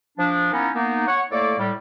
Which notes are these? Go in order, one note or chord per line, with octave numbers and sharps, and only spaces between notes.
F3 D4
A#3 B3 C#4 D#4 E4
A#3 B3 D#4
C#5 F#5
A2 A3 A#3 A4 D5 D6
A2 G3